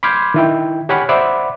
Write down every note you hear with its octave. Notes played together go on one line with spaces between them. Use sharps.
B5 C6 D6 F6 G6 G#6
D#3 E4 G5
G4 C#5 F#5 G#5 B5 F6
C5 D5 E5 F#5 B5 D6